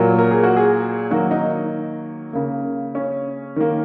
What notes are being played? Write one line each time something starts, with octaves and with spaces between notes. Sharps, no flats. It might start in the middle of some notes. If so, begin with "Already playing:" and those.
Already playing: A#2 F#3 A#3
A#4
G#4
F#4
G#4
D#3 F#3 A#3 F#4
D#4
C#3 A#3
C#4
D#3 A#3